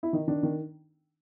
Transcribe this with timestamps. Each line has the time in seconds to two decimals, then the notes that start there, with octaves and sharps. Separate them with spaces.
0.03 E4
0.13 D#3 D#4
0.28 D#3 D4
0.43 D#3